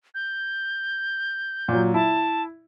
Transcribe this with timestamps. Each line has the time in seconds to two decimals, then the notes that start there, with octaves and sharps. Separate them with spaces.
0.15 G6
1.68 A#2 F#3
1.94 E4 A5